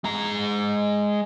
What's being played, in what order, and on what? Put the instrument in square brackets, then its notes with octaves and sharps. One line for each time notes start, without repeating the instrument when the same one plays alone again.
[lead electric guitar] G#3 A#5